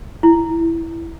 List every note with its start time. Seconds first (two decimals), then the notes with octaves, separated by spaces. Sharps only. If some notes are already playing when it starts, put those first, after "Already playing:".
0.23 E4